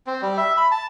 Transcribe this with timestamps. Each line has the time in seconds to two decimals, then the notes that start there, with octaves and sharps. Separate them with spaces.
0.07 C4
0.22 G3
0.37 E5
0.57 B5
0.71 A5